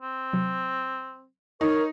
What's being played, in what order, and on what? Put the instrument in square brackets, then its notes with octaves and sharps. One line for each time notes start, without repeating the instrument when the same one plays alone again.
[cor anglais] C4
[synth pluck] C3 F#3
[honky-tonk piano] D#4 [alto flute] A#4 [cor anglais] C#5